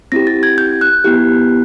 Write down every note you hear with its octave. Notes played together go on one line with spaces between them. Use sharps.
C4 E4 G4 A#6
A6
G#6
G6
F#6
B3 E4 G4